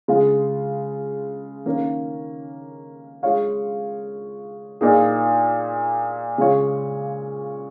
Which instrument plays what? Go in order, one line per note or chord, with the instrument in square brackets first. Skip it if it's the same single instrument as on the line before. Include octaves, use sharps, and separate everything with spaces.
[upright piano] C#3 G#3 F4
D#3 A#3 C#4 A#4
G#3 F4 C#5 F5
A#2 A#3 D#4 G#4
C#3 G#3 F4 C#5 F5